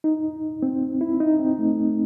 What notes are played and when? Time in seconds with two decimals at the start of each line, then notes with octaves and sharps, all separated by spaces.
0.04 D#4
0.63 C4
1.01 E4
1.20 D#4
1.39 C4
1.59 A3